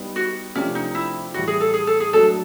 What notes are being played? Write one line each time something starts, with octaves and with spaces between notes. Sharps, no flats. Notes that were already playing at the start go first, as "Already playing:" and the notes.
Already playing: G3 B3 D#4
F#4
C3 F3 A3 C#4 D4 G4
D#4
E4
A2 E3 G3 F#4
G#4
A4
G#4
A4
G#4
F#3 A3 D4 F#4 A4